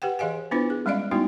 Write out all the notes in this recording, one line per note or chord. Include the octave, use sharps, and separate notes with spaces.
G4 B4 F#5 G5
E3 G#4 D#5 F5 G#5
B3 D4 E4 F4 B4 C5
G#4
G3 G#3 C#4 D5 D#5 F5
G3 A3 B3 D#4 E4 F#4